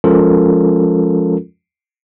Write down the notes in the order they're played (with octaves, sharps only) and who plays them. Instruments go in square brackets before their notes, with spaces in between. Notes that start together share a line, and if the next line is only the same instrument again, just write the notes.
[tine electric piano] F3 G#3 C#4 F4 A4 A#4